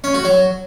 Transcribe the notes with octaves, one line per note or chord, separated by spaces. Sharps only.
C#4
F#4
F#3